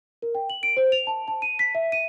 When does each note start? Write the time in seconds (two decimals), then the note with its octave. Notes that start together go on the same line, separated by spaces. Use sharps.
0.22 A#4
0.35 G5
0.50 F#7
0.63 D7
0.77 C5
0.92 F7
1.07 A5
1.28 A5
1.42 D#7
1.59 B6
1.75 E5
1.92 D#7